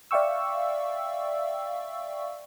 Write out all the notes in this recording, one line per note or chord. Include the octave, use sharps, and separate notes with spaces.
D5 E5 F5 G5 C#6 E6